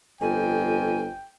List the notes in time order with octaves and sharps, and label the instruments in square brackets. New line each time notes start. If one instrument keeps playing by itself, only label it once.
[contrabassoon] G1 [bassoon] F2 [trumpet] G5 [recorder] G#5